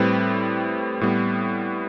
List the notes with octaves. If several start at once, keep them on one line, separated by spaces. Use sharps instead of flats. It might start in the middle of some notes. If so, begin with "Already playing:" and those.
Already playing: A2 G3 C4 G4 B4
A2 G3 B3